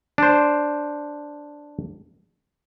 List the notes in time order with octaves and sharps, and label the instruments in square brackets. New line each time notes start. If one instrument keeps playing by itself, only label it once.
[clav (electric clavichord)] D4 C5